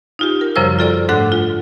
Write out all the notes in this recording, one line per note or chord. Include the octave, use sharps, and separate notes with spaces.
D#4 F4 G4
A#4
F#2 C#3 F3 G3 C5 E6
F4 A4 D5
G#2 A3 D4 A4 F#5 F#6
F4